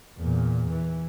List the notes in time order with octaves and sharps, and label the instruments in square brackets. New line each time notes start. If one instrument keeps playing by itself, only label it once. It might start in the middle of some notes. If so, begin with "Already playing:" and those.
[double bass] E2 A#2
E3